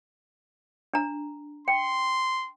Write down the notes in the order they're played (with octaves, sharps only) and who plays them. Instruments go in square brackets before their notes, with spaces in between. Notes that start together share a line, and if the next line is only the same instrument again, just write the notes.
[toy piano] D4 A#5
[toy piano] G5 [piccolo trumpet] C6